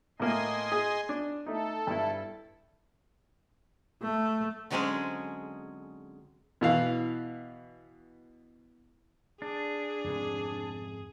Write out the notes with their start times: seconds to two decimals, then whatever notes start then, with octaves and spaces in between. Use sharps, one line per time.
0.20 A2 A#3 D#5 G#5 C6
0.72 G#4
1.09 D4
1.46 A3 D#4 A4
1.87 G2 E4
4.02 A3
4.70 D3 F#3 G#3 C4 C#4 G#4
6.61 B2 E3 F5
9.42 D4 G#4
10.04 F2 G#2 C3